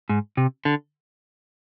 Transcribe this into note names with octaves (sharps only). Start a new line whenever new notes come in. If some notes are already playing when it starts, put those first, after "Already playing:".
G#2
C3
D3